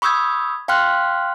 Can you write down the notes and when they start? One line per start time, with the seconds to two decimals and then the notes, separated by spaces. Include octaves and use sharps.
0.02 B5 C#6 D#6 E6 G6 G#6
0.68 F5 G5 C6 F6 F#6